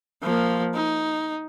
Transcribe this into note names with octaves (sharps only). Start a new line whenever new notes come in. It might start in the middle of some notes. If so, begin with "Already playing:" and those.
F3 A#3
D#4